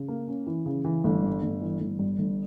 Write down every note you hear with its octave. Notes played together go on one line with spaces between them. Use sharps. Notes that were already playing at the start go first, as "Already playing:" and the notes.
Already playing: C#3
A#3
C#4
E3
C#3
E3
G1
G2
G1
E3
G1
G2
G1